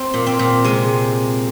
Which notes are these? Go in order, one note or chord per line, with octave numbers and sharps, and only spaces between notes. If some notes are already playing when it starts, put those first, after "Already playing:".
Already playing: C4
A#2
C4
A#2
C3 G#3